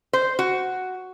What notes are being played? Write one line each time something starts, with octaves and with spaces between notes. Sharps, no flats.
C5
F#4